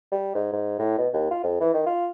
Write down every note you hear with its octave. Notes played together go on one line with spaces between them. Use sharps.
G3
G#2
G#2
A2
B2
D#2
F4
F2
E3
D#3
F4